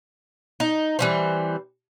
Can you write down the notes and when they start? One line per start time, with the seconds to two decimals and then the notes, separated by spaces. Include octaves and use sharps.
0.60 D#4
0.99 E3 G3 C4